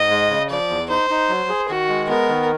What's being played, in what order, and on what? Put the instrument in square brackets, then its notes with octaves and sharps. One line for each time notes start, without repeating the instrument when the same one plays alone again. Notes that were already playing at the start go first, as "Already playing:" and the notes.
Already playing: [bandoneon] G#2 [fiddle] D#5
[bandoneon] G#3
C#3
[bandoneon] F3 [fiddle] D5
[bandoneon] E2
[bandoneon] D#4 [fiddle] C5
[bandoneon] D#4
F#3
G#4
[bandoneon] D#3 [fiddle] F#4
[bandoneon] G#3
[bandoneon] B3 [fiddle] A#4
[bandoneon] D#3